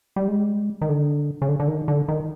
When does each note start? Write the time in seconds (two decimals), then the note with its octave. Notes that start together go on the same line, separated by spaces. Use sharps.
0.16 G3
0.28 G#3
0.82 D#3
0.89 D3
1.42 C#3
1.48 D3
1.60 D3
1.68 D#3
1.88 D3
2.08 D#3